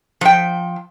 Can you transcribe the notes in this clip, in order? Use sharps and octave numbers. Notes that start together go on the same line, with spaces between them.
F3 G5